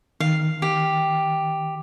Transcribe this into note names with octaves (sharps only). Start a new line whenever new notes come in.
D#3 F5
G4